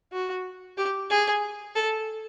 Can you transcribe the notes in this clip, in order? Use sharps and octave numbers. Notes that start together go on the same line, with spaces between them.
F#4
G4
G#4
A4